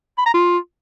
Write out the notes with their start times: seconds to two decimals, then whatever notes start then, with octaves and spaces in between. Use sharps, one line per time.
0.18 B5
0.26 A#5
0.34 F4